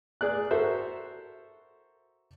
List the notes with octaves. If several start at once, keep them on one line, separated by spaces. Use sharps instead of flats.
G#4 D5 F#6
F#4 A4 A#4 C5 E5